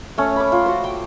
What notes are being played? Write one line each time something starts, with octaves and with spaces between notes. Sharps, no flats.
A3 C#4
B5 D6
F4
F#4 C5
G5 C6 D6